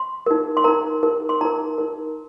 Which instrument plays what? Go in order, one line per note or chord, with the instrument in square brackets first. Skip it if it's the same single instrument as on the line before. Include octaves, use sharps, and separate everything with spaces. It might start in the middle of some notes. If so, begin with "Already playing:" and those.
Already playing: [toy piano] C6
D#4 A#4
C6
D#4 A#4 A#5
D#4 A#4
C6
D#4 A#4 A#5
D#4 A#4